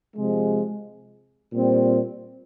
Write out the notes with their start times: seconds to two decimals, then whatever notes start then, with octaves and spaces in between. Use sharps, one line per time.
0.16 C3 F3 G#3
1.53 A#2 G3 C4